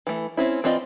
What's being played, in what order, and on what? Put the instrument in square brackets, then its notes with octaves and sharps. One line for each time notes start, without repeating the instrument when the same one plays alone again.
[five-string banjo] E3 A3
C4 C#4 E4
E3 C4 F4 D5 D#5